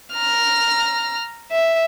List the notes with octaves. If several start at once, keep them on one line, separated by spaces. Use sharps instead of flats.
A#5 F6
E5